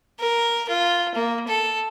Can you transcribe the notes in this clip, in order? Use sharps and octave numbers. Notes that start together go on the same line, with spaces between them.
A#4
F4
A#3
A4